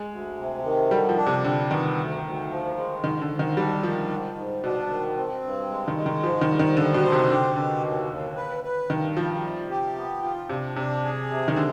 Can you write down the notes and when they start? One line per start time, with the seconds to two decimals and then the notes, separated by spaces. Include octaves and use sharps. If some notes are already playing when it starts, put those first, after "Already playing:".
Already playing: G#3
0.10 D2
0.37 C3
0.64 D#3
0.91 D3 G3
1.09 F3
1.17 D4
1.26 C3
1.44 D3 G3
1.70 D#3 B3
1.97 D2
2.24 D2
2.50 F3
2.77 G#3
3.03 G#2 D#3
3.21 D3
3.30 G#2
3.39 D#3
3.56 G3 D4
3.83 D#3 F3
4.10 G#2
4.37 G#2
4.64 B2 D4
4.90 D#3
5.17 C4
5.44 G2
5.71 G#3
5.88 D#3
5.97 G#3
6.06 D#3
6.23 G#2 F3
6.41 D#3
6.51 G3
6.59 D#3
6.76 D3 F3
6.94 B2
7.03 C5
7.12 C3
7.30 D3 G4
7.56 B2 D3
7.83 D#2
8.10 D#2
8.36 B4
8.64 B4
8.90 G2 D#3
9.17 F3 G3
9.43 C3
9.70 G4
9.97 B3
10.23 F4
10.49 C3 D4
10.76 C3 D4
11.03 G#4
11.30 C3
11.48 D#3
11.56 D3 G#3